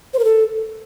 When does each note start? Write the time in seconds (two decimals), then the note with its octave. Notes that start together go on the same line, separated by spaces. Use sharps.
0.14 C5
0.19 A#4
0.24 A4